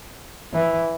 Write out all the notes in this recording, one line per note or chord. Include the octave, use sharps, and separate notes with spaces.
E3